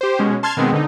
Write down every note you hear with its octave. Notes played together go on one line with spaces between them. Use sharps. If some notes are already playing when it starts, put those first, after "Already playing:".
G4 C5
B2 G#3 C#4
A5 C6 F6 G#6
B2 D#3 G#3 B3 C4
D3 D#4